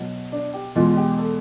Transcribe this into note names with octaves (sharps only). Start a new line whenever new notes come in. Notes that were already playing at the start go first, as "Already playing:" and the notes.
Already playing: B2 F#3
D4
G4
E2 B2 G#3 F4
G4
A4